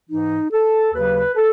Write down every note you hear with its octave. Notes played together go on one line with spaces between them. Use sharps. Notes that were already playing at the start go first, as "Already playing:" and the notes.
G#2 E3 D#4
A4
D#2 C#3 F#3 B4
A4